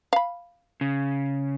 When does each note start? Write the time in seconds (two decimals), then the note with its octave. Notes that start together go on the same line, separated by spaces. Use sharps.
0.13 F5 B5
0.81 C#3